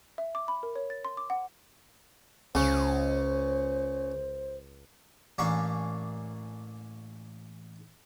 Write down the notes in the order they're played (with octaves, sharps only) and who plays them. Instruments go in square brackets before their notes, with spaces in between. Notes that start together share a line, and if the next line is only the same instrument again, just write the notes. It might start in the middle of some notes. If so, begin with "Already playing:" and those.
[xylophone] E5
D6
B5
A#4
C#5
A6
C6
D6
F#5
[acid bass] C#2 [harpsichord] C#3 C#4 [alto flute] C5
[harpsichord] A1 A#3 C#4 D4 C#6